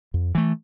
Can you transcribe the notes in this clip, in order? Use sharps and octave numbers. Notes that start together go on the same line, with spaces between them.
F2
E3 A3